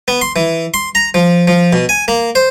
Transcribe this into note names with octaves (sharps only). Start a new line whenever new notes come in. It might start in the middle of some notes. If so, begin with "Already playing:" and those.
B3
C6
E3
C6
A#5
F3
F3
B2
G#5
A#3
C5